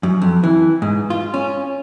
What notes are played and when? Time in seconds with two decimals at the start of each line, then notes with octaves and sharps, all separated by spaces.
0.03 F#2
0.22 F2
0.44 E3
0.82 G#2
1.10 F4
1.34 C#4